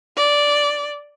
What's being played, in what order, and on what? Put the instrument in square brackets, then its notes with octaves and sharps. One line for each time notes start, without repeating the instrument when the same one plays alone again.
[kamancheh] D5